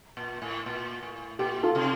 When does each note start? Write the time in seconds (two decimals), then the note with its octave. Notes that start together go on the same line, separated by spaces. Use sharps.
0.17 A#2
0.42 A2
0.66 A#2
1.03 A2
1.39 A#2 G4
1.63 F4 A4
1.75 C3